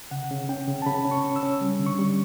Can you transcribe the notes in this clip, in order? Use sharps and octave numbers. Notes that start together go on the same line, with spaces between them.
C#3 F#5
C#3
C#4 G5
C#3
A5
C#3 B5
C#4
C#6
C#4
E6
C#4
G3
D3
C#6
G3